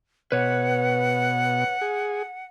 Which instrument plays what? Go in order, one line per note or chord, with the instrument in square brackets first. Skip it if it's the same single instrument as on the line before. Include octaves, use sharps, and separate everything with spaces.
[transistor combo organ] B2 [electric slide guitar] B4 C#5 [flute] F#5
[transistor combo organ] G#4